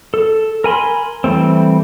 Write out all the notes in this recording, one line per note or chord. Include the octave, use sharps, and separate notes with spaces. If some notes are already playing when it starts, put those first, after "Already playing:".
A4
A#4 G#5 B5 C6
E3 G3 A3 C4